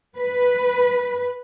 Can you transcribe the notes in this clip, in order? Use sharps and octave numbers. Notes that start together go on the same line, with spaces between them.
B4